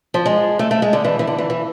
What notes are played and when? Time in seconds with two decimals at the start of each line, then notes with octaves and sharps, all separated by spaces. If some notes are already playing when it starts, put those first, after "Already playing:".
0.14 F3
0.26 G#3
0.59 A3
0.71 A3
0.82 G#3
0.93 D3
1.04 E3
1.19 E3
1.27 D3
1.38 E3
1.50 E3